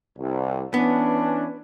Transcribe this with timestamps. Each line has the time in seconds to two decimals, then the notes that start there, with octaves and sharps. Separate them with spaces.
0.17 C2
0.74 E3 B3 C#4 D4